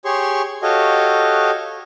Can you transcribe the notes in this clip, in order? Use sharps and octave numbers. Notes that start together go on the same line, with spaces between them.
G4 G#4 C#5 C6 C#6
F#4 G4 A4 C#5 D#5 F5